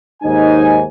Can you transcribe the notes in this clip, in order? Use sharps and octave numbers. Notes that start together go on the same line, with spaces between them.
D#2 G#2 D#4 G#5